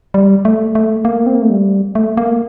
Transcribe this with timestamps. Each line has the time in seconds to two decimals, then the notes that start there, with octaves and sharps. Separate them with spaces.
0.14 G3
0.45 A3
0.75 A3
1.05 A#3
1.26 C4
1.35 A#3
1.42 A3
1.50 G3
1.95 A3
2.17 A#3